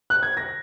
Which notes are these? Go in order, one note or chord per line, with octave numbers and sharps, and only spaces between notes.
F#6
G#6
A#6